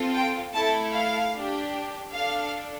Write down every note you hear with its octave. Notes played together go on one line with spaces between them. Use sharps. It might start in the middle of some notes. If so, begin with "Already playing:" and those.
Already playing: C4 F4 A4
G5
A3 E4 A4 A5
F5
D4 G4
D4 A4 F5